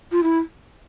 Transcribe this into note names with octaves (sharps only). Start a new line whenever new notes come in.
F4
E4